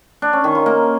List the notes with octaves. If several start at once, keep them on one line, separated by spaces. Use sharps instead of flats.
D4
C#4
D#3
F4
A#3